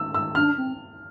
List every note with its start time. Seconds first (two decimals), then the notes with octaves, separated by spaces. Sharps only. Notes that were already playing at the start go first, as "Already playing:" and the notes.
Already playing: E6
0.14 E6
0.35 D4 F6
0.57 C4